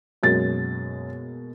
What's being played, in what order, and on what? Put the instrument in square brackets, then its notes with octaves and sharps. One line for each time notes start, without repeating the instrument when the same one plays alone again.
[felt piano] F#2 A6 [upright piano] B2 G#3 A#3